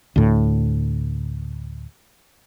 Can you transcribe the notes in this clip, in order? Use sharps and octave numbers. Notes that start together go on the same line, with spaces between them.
D2 A2